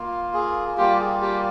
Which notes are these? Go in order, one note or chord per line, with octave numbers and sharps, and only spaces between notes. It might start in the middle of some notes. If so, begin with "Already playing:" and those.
Already playing: A#3 F4
G#4
G3 A#3 F4 G4
G#4
G4